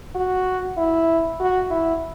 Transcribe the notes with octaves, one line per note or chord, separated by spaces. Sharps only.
F#4
E4
F#4
E4